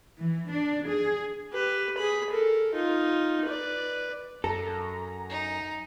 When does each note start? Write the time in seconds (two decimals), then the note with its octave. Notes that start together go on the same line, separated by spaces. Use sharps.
0.19 E3
0.51 D4
0.89 G#4
1.53 G4 B4
1.98 G#4 B5
2.30 A4 A#4
2.74 D#4 F4
3.45 B4 D5
4.44 F#2 A4 A#5
5.29 D#4